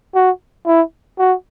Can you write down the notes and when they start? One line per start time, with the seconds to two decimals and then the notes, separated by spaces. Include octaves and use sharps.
0.15 F#4
0.66 E4
1.18 F#4